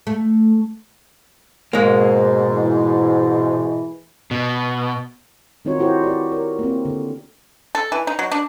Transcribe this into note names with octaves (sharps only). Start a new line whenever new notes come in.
A3
G#2 B2 G#3 A#3
E3
B2
D#3 C4 D#4 F4 F#4 C#5
E4 F#4 G4 C5 C#5
G4 B4 D5
A#4 C#5
A#3 C4
D3
A4
E3
D#4
F#3
D4